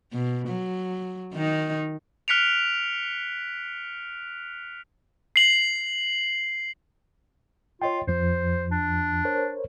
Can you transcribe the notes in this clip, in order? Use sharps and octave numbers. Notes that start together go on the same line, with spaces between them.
B2
F#3
D#3 D#4
F6 F#6 B6 C#7 D7 F7
C7 F#7
F4 C#5 D#5 G5
F2 F3 C5
D4
A#4 C5 C#5